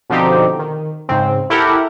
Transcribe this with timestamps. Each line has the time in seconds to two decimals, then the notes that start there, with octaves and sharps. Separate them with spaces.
0.10 B2 D3 F3 C4 D#4 G4
0.59 D#3
1.09 G#2 C#3 C4
1.50 E4 G4 A4 A#4 F#5